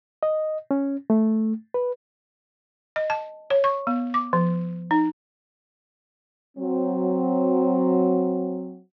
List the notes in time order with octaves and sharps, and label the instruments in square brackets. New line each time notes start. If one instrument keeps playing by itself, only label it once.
[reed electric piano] D#5
C#4
A3
B4
[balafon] D#5
A5
C#5
C#6
B3
D6
F3
D#4
[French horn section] F#3 C4